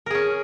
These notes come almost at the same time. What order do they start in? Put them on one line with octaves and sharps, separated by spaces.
A#4 G#4 C#4